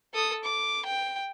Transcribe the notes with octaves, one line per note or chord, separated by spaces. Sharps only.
A4 D#6
D6
G5